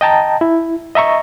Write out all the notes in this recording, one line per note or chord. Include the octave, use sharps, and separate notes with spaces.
D#5 G5 A5 A#5
E4
D#5 E5 A#5 C#6